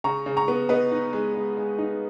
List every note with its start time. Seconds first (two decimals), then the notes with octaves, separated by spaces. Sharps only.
0.04 C#3 A#5 C#6
0.26 C#3
0.37 A#5 C#6
0.48 B3
0.69 B3 B4 D#5
0.91 D#4
1.13 G#3
1.35 G#3
1.57 G#3
1.78 D#4